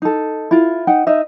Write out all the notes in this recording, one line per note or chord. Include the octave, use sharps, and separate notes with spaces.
D#4 A4
E4 F4
D#4 F#5 G5
D#4 D#5 E5